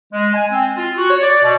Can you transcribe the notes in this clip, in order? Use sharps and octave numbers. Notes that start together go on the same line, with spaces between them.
G#3
G#5
C4
F4
F#4
C#5
D5
B2